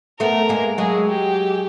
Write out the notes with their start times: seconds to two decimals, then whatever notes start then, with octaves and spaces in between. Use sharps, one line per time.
0.20 A3 B3 A#4
0.49 G#3 A#3
0.78 F#3 G#3 G#4
1.07 G4